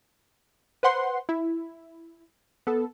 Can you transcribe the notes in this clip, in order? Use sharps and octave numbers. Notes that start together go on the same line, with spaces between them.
B4 C5 F#5 C6
E4
B3 A4